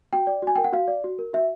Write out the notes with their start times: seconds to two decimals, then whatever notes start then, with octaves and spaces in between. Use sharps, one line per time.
0.13 F#4 G5
0.27 D5
0.42 F#4 G#5
0.55 A#4 G5
0.64 F#5
0.73 F#4 F5
0.88 D5
1.04 F#4
1.19 A#4
1.33 F#4 E5